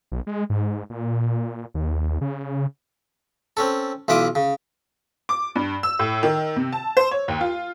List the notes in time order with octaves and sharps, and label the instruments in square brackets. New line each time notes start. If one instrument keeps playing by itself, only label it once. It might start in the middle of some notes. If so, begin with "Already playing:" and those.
[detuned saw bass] B1
G#3
G#2
A#2
D#2
C#3
[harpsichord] C4 C#4 A4
B1 E3 F4 E5 D6 D#6
C#3
[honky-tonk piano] D6
G2
E6
A2
D#3
C3
A5
C5
C#5
D#2
F4